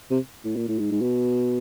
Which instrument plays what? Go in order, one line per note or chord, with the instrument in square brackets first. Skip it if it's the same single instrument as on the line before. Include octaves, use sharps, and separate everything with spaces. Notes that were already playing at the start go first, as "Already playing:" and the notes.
[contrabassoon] C3
A2
A#2
A2
G#2
G#2
B2